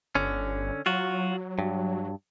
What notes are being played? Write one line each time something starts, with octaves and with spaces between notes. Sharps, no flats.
G1 D3 C#4
F#3 F4 F#4
G2